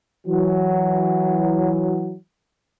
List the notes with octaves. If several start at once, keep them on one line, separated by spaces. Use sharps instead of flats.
E3 F#3